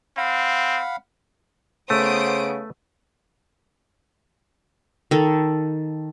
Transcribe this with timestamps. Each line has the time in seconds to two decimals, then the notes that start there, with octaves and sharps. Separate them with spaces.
0.18 C4 F5 F#5 B5
1.90 C#3 A3 B3 C5 D#6 D7
5.11 D#3 A4